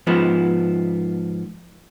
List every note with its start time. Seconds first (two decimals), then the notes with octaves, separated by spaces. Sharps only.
0.07 G#2 F3 B3